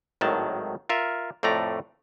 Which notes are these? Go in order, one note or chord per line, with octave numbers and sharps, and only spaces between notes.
G#1 A2 D#3 F#3 A5
F4 A#4 E5
F2 A2 A3 D5 A#5